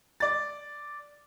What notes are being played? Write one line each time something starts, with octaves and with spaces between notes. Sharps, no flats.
D5 A6